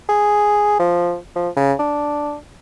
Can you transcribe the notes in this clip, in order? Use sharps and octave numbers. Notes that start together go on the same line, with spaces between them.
G#4
F3
F3
C#3
D4